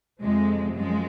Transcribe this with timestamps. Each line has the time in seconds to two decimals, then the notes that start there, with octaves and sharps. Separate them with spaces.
0.22 F2 C3 F3 G#3
0.76 F#2 F3 G#3